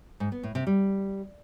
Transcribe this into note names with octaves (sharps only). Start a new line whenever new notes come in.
G#2
B3
A2
C3
G3